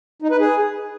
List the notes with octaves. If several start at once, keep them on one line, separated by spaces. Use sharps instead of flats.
D#4
B4
G#4